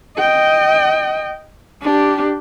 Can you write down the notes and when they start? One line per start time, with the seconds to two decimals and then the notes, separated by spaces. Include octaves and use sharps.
0.18 D#5 G5
1.82 D4 G4